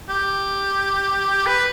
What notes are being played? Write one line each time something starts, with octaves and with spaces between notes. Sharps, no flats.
G4
B4